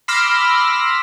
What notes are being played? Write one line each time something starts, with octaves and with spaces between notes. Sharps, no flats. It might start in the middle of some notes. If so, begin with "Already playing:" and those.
B5 C6 D6 E6 F6 A#6